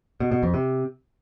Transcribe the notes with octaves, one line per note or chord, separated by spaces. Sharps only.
B2
B2
F2
C3